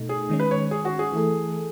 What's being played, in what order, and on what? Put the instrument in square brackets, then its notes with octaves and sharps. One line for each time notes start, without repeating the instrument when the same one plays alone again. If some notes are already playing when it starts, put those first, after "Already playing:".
Already playing: [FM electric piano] B2 A3 D#4
[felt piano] G#4
[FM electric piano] D#3 G#3 C#4
[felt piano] B4
C#5
G#4
F#4
G#4
[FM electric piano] E3 A3 E4 A4